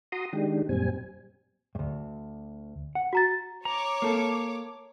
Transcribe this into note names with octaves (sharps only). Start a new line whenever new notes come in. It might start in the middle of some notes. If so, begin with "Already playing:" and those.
F#4 A#5 C6 D#6
D#3 G#3 D4 G4
F#2 A#2 G3 C4 G#5
D2 G2
F#5
F#4 A#5 A6
C#5 A#5 D6
A#3 A4